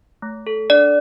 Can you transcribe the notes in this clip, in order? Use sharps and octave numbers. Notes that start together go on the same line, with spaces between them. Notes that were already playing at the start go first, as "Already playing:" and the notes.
A3
A4
D4 D5